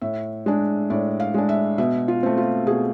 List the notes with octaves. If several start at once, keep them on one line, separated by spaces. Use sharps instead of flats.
A2 E5
G#3 D4
A2 D5
F5
G#3 D4
E5
B2 E5
F4
A3 C4
F4
B2 G#4